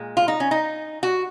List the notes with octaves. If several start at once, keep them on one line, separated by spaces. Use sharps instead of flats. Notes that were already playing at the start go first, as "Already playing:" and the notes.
Already playing: A#2 G#3
F4
D#4
C#4
D#4
F#4